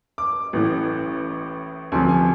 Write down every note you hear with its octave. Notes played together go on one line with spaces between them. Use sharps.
D6
A1 A2 E3
D2 C3 F3 G#5
G#5